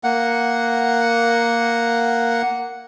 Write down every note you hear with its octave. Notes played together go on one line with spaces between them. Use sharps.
A#3 F#5